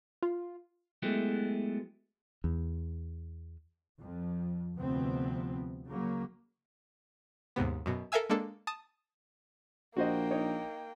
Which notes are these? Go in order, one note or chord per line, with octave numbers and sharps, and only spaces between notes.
F4
F#3 G#3 A3 B3 E4 G4
E2
F2
D2 C3 F3 B3 C4
C#3 F#3 A#3
D#2 G#2 C3 B3
F#2 B2
A4 A#4 E5 F5 G#5 E6
G#3 A#3 D4 A4
A5 D#6
A#1 A#3 F#4 C5 D#5 G5
D#4 C#5